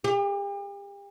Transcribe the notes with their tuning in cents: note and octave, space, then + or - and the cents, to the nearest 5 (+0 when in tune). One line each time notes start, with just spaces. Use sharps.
G4 +40